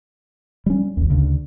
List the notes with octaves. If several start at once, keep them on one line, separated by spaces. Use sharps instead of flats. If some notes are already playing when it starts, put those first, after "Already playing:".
G3 C#4
G#1 D#2
D2 C#3